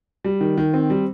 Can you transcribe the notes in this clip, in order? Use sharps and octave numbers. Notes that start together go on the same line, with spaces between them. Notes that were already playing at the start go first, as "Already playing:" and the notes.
G3
D#3
D#3
C4
G3